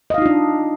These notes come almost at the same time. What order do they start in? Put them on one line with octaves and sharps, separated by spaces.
D#5 F5 D#4 F4 D4